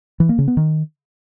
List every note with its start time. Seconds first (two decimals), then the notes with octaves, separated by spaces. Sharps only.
0.20 E3
0.29 A#3
0.38 C#3
0.48 B3
0.57 D#3